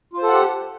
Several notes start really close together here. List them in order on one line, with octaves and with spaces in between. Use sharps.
F4 C5 A4 F#5 G4